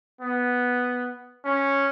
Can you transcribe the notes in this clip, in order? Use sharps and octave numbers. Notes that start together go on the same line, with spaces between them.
B3
C#4